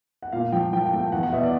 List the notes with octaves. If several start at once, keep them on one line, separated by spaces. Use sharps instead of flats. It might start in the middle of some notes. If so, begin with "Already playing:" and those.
F#5
A#2 F5
F3 G5
F3 G5
G5
A3
G5
E2 F#5
F#5
B2 E5
D5